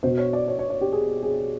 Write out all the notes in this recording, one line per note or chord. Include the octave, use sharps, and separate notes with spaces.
B2 C5
C#5
D5
C#5
C#5
C#5
G4
G#4
G#4